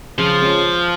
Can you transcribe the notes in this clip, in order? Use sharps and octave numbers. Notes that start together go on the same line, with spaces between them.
C#3 F3
G#3 C#4 F4